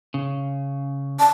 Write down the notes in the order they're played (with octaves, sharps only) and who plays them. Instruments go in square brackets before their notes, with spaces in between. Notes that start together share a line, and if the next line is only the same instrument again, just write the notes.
[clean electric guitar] C#3
[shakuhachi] A5